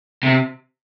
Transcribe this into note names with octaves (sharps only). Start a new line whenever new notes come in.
C3